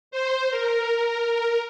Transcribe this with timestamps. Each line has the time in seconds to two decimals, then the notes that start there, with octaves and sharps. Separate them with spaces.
0.11 C5
0.50 A#4